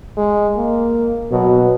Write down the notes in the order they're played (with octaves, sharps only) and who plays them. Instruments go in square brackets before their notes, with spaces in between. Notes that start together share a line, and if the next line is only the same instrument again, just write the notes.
[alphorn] G#3
A#3
[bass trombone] B2 [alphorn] F#3